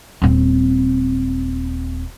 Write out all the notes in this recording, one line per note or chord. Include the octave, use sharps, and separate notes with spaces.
D#1 C4